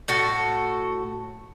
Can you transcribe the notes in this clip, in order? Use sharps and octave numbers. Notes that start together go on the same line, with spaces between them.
A2 F#4 A4